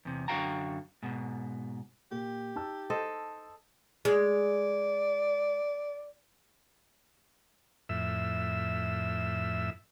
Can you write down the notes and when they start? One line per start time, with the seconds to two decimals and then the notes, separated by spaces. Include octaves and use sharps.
0.05 E2 C3
0.28 F#2 D3 F#4 F5 G5 A#5
1.03 G#2 B2
2.11 A#2 G4
2.56 D#4 A5 E6
2.90 A4 C5 D#5
4.05 G#3 D5
7.89 F2 A2 E5 E6